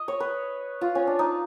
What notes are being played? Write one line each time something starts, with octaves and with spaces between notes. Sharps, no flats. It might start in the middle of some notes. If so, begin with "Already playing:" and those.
Already playing: D#5
C#5
B4
F4
C#4
D4
D#4